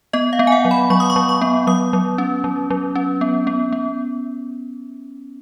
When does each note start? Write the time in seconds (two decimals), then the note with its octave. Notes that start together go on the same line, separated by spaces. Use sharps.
0.13 B3 D#5
0.33 F5
0.39 B3
0.47 G#5
0.52 F#5
0.65 F#3
0.71 B5
0.90 F#3 C#6
1.00 D#6
1.10 C#6
1.16 F#3
1.29 C#6
1.41 B3
1.67 F#3 D#6
1.93 F#3
2.18 C#4
2.44 F#3
2.70 F#3
2.95 C#4
3.21 B3
3.47 B3
3.73 B3